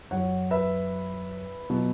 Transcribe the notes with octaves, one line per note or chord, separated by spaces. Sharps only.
F#2 F#3 C#5 F#5
B4 E5
B2 F#3